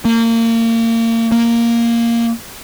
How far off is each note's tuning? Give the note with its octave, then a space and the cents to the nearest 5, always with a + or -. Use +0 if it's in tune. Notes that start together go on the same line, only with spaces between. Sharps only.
A#3 -30
A#3 +0